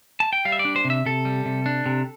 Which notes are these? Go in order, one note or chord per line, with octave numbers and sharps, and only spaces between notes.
A5
G5
G3 F5
E5
D5
D4
C5
C3
E5
C3 A4
G3
C3
D4
C3